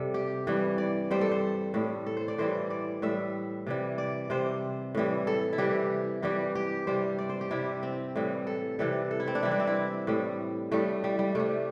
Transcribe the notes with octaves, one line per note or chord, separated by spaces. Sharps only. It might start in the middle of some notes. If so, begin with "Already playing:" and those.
Already playing: C3 G3 A4
G4
G2 E3 G3
D5
G2 G3 C5
A4
C5
A2 G3
A4
C5
D5
A2 E3 G3 C5
D5
A2 G3 E5
C3 E3 G3
D5
C3 G3 C5
A2 E3 G3
A4
E4
C3 E3 G3 G4
G2 E3 G3 G4
G4
C3 G3 C5
D5
C5
G4
C3 G3 E4
C4
A2 E3 G3
A4
C3 E3 G3 A4
A4
E4
C4
D4
C3 E3 G3 E4
D4
C4
E4
A2 G3
A2 G3 A3
G3
G3
C3 G3 A3